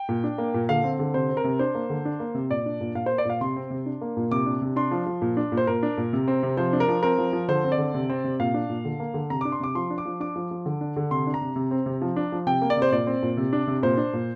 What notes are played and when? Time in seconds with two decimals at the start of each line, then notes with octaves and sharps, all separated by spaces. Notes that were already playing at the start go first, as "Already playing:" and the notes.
Already playing: G5
0.09 A#2
0.24 D4
0.38 A#3
0.54 A#2
0.69 D3 F5
0.84 C4
0.99 D3
1.14 C3 C5
1.29 C4
1.37 A#4
1.44 C3
1.59 D4 C5
1.75 A#3
1.90 D3
2.05 D4
2.20 A#3
2.35 C3
2.50 A#2 D5
2.66 D4
2.81 A#2
2.95 A#2 F5
3.06 A#3 C5
3.18 D5
3.25 A#2 F5
3.41 C3 C6
3.56 C4
3.70 C3
3.86 D4
4.01 A#3
4.17 A#2
4.31 C3 D6
4.46 D4
4.62 C3
4.76 D4 C6
4.91 F3
5.06 F3
5.22 A#2
5.37 D4
5.52 A#2
5.57 C5
5.67 A#2 A#4
5.83 D4
5.97 A#2
6.13 C3
6.28 C4
6.43 C3
6.57 F3 C5
6.73 D4
6.80 A#4
6.88 F3
7.03 C4 A#4
7.18 F3
7.33 F3
7.48 D3 C5
7.64 C4
7.72 D5
7.78 D3
7.94 C3
8.10 C4
8.24 C3
8.39 A#2 F5
8.54 D4
8.70 A#2
8.85 D3
9.00 A#3
9.14 D3
9.30 C3 A#5
9.41 D4 D6
9.52 C6
9.60 C3 D6
9.75 F3 C6
9.90 D4
9.98 D6
10.06 F3
10.20 D4 D6
10.36 F3
10.51 F3
10.66 D3
10.81 D4
10.96 D3
11.11 C3 C6
11.27 D4
11.34 A#5
11.41 C3
11.56 C3
11.71 C4
11.86 C3
12.02 F3
12.16 D4
12.32 F3
12.47 C3 G5
12.62 A#3
12.70 D5
12.77 C3
12.82 C5
12.92 A#2 D5
13.07 C4
13.22 A#2
13.37 C3
13.53 D4
13.67 C3
13.83 A#2 C5
13.97 D4
14.13 A#2